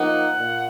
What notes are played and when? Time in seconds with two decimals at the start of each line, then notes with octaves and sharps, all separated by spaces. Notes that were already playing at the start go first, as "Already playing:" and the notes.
Already playing: F3 A#3 D#4 F#5
0.39 A#2